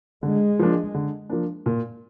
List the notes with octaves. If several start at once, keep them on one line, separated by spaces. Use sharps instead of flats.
D3 G#3
F3 A#3 D4
D3
F3 A#3 D4
A#2